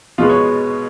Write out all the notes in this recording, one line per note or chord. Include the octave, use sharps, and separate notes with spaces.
B2 G#3 B3 F4
C#5